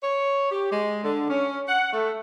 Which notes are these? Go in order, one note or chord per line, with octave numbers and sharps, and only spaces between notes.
C#5
G4
G#3
D3
C#4
F#5
A3